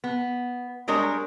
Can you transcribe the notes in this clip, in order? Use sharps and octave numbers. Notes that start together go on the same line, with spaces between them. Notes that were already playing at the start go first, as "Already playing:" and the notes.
B3
G3 G#3 D4 A#4 C#5